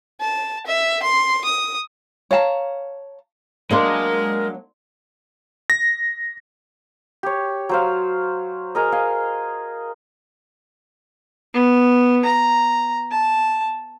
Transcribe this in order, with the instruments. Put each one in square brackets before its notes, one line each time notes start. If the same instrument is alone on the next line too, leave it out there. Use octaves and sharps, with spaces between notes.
[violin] A5
E5
C6
D#6
[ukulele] C#5 F5 A5 A#5
[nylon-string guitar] F#3 A#3 D4 [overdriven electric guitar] G#3 D#5 [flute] A#4 [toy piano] D5 C6
[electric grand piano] A#6
[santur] G4 C#5
F#3 C5 F5
G#4 A#4 D#5
D#5 F5 G#5
[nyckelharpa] B3
A#5
A5